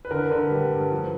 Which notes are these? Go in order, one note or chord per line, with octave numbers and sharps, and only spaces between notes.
B4
D3 A#4
D3 B4
G3
G2
F3